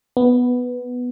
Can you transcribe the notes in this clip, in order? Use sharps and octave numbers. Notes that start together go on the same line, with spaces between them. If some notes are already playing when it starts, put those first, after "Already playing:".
B3